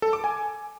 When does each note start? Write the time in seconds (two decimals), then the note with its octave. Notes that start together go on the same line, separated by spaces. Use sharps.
0.02 A4
0.13 D6
0.24 G#5